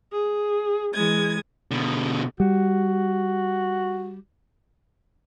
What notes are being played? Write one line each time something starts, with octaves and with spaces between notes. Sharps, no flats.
G#4
E3 G#3 D#6 G#6
B2 D3
G3 F#4